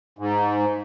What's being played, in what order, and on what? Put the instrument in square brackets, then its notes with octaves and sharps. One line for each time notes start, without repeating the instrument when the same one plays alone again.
[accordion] G#2